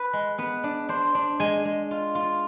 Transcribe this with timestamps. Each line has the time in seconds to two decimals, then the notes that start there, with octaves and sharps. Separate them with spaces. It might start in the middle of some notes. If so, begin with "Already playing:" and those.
Already playing: B4
0.13 G#3
0.38 B3 B4
0.64 D4
0.89 D4 C5
1.15 D4
1.40 G#3 G#5
1.65 G#3
1.91 F4
2.15 F4